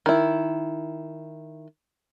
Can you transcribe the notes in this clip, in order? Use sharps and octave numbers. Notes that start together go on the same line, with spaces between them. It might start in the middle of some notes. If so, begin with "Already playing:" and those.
D#3 E4